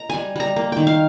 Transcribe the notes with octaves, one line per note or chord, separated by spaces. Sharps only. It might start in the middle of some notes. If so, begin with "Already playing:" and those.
Already playing: A#5
G3 G#5
G3 A#5
A#3
D#3 G5
F5